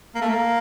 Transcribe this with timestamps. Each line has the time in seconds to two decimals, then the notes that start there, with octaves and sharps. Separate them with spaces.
0.15 A#3
0.22 A3
0.29 A#3